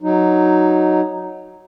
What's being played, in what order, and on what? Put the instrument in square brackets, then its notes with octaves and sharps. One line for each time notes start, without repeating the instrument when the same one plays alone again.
[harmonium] F#3 D#4